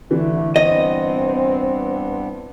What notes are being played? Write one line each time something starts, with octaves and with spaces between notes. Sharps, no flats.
D3 E3 A3
G2 B3 C4 D#5